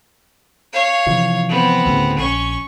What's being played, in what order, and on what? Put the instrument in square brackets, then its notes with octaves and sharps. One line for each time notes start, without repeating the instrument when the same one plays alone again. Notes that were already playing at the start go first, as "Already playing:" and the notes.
[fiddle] C#5 F5
[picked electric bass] C3 E3 F3
[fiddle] B3 C4
[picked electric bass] D2 A2 C#3
[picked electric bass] A#1 [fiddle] C#4 C#6